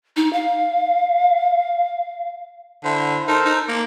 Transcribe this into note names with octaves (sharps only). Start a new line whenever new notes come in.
D#4
F5
D3 E4 C5
D#4 A4 A#4 C5
D#4
A#3 D6